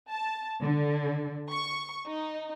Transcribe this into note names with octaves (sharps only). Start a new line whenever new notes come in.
A5
D3
C#6
D#4